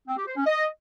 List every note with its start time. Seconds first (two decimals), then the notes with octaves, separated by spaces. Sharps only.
0.08 C4
0.17 G4
0.27 C5
0.36 C#4
0.46 D#5